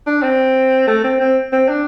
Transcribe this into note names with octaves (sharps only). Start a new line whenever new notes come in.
D4
C4
A3
C4
C4
C4
D4